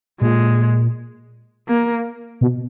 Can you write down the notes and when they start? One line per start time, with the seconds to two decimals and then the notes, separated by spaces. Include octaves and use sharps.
0.21 A#2 G#3
1.68 A#3
2.41 B2